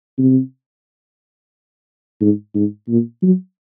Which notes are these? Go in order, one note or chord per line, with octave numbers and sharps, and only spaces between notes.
C3
G#2
G#2
A#2
F#3